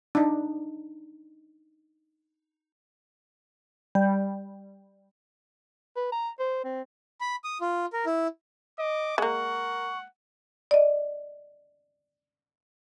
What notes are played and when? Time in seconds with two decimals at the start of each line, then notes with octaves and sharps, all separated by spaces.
0.15 D4 D#4
3.95 G3
5.96 B4
6.12 A#5
6.39 C5
6.64 C4
7.21 B5
7.44 D#6
7.61 F4
7.93 A#4
8.06 E4
8.79 D#5 D6
9.18 G#3 A#3 A#4 F#5 C#6
10.71 D5 D#5